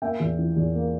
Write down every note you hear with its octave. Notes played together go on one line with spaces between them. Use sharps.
A#3 E5 G5
E2
E3
E2
A#3